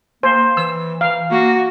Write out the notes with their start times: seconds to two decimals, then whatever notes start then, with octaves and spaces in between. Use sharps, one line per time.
0.23 A#3 C5
0.57 E3 E6
1.01 E3 F5
1.31 A#3 F#4